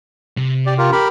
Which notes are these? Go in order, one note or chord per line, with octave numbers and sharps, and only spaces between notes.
C3
G4 D5
F4 G4 A#4
G4 A#4 B5